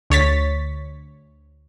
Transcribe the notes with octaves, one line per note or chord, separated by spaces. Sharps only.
D2 C#5 A6 B6